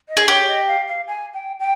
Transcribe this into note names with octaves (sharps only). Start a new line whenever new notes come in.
D#5
G#4
G4 C#5
D#5
F5
F5
G#5
G5
G5